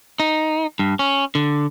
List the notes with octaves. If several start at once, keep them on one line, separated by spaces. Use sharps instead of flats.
D#4
G2
C#4
D3